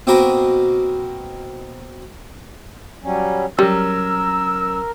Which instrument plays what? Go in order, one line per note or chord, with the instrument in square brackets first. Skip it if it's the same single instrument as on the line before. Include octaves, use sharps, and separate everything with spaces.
[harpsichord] B2 A#3 C4 F#4 A#4 B4
[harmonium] F#3 G3 C#4
[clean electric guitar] F#3 C#4 [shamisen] G3 [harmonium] A#4 [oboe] E6